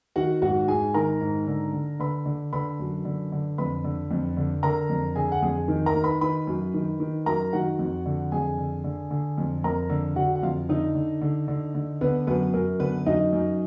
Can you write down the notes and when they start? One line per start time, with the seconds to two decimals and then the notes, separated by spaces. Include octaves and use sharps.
0.16 D#3 F#4 F#5
0.42 G#2 F#4 F#5
0.68 G#2 G#4 G#5
0.94 D#3 A#4 A#5
1.21 G#2
1.47 D3
1.73 D3
2.00 D3 B4 B5
2.26 D3
2.53 D3 B4 B5
2.80 F#2
3.05 D3
3.32 D3
3.58 F2 B4 B5
3.84 D3
4.11 F2
4.37 D3
4.63 D3 A#4 A#5
4.89 F2
5.15 D3 G#4 G#5
5.32 F#5
5.42 F2 G#4 G#5
5.68 D#3
5.86 A#4 A#5
5.94 D#3
6.04 B4 B5
6.21 D#3 B4 B5
6.47 F#2
6.74 D#3
7.00 D#3
7.26 F#2 A#4 A#5
7.53 D#3 F#4 F#5
7.79 F2
8.06 D3
8.32 F2 G#4 G#5
8.58 D3
8.84 D3
9.11 D3
9.38 F2
9.64 F2 A#4 A#5
9.90 D3
10.16 D3 F#4 F#5
10.35 F#5
10.43 F2 F4 F5
10.69 D3 D#4 D#5
10.95 D3
11.22 D3
11.48 D3
11.75 D3
12.01 D3 B3 B4
12.27 F#2 B3 B4
12.53 F#2 A#4
12.80 D3 B3 B4
13.06 F#2 D#4 D#5
13.33 F#2